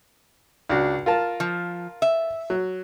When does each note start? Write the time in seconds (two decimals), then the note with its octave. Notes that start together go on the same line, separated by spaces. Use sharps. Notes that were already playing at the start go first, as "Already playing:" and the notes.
0.70 C#2 D4 F#4
1.06 F4 A#4 A5
1.40 F3
2.02 E5
2.50 F#3